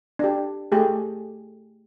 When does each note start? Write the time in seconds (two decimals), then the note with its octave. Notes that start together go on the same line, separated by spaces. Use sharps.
0.19 D4 G4
0.72 A3 G4 G#4